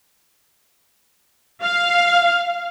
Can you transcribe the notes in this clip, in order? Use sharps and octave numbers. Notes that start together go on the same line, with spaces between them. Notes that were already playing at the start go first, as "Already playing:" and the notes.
F5